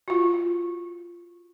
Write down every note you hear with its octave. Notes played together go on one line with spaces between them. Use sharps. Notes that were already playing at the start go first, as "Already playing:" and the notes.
F4 F#4